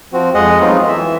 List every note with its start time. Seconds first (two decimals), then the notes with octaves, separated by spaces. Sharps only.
0.13 F3 C4 F#4
0.34 F2 G#3 G#4 D#5 F#5
0.60 F#3 A3 B3 C4 D#4 F4
0.87 E3 E5